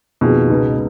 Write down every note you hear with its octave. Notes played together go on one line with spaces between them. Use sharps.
F2 B2 D#3 A#3 F4 G#4
C#2 C#3 G#3 B3 D#4